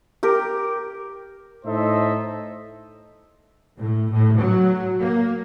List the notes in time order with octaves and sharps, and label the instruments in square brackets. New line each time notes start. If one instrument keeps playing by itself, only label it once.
[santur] G4 A#4
[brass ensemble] A2 D#4 A4 C5 D#5 E5
[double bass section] A2
A2
F#3
A#3